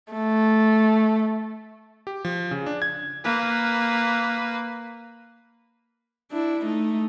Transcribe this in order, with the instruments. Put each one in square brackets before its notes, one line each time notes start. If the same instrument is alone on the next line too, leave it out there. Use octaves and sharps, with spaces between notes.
[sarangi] A3
[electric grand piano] G4
F3
C#3
D4
G#6
[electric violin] A#3 B4
[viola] D4 E4
A3 D#4